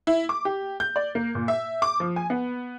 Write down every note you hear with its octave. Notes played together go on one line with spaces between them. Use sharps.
E4
D6
G4
G6
D5
A#3
A#2
E5
D6
F3
G#5
B3